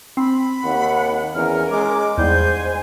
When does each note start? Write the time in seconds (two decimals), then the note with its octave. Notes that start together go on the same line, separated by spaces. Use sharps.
0.17 C4 B5
0.64 D#2 F#5
1.35 E2 C#4 A#4 F6
1.71 G#3 D6
2.18 E2 G#2 G3 C5 G#5 G6